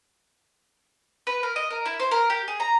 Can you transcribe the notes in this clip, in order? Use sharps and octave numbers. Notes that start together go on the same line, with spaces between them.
B4
A#4
D#5
A#4
E4
C5
A#4
G4
G#4
A#5